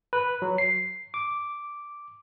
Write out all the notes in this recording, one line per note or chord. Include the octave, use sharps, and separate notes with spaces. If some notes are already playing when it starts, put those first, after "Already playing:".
B4
F#3
C7
D6